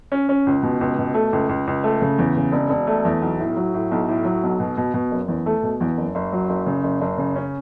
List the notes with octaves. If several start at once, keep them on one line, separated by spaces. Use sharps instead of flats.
C#4
C#4
C#2
B2
C#2
B2
A3
C#2
C#2
C#2
A3
C#3
E2
C#3
E1
E1
A3
E2
B1
A2
F#3
A2
B1
A2
F#3
B1
B2
B2
B2
F#1
E2
A3
B2
E2
F#1
F#1
F#3
F#1
C#3
F#1
F#1
C#3
C#4